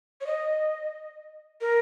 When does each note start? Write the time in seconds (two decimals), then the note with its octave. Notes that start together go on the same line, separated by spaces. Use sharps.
0.21 C#5
0.26 D#5
1.61 A#4